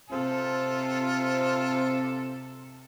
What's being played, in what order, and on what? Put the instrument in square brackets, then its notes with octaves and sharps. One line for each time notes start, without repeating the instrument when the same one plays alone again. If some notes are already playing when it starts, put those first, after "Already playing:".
[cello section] C3 A4 [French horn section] C4 [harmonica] F4 [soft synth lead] C5